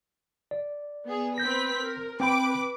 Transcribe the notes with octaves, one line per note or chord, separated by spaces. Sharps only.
D5
B3 G#4
C4 B4 G6 A#6 B6
A#4
C4 B4 G5 B5 D6